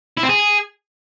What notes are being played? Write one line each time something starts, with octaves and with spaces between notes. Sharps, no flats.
E4
C4
G#4